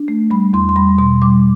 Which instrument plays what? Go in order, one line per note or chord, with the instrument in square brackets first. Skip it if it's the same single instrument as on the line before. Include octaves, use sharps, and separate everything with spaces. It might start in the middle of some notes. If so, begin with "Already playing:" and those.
Already playing: [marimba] D4
A3
G3 B5
E2 C6
C6
G3 B5
B2 C6
G3 D6